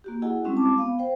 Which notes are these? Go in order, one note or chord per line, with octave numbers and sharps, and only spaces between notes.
A#3 F#4 G4
E4 F#4 G#4 D#5 F#5 G#5
G3 G#3 C4 C#4 E4 F#4
A5 D6
B3 F5
C5 F5 G5